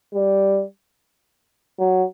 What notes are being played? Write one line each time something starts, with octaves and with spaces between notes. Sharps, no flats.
G3
F#3